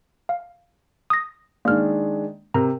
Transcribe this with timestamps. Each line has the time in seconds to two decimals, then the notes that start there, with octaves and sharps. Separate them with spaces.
0.29 F5
1.10 D#6 A#6
1.65 D#3 G#3 A#3 D4 F6
2.54 C3 A#4 A#5